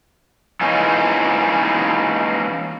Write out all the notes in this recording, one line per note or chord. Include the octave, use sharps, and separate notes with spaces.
E3 G#3 A#3 C#4 D#4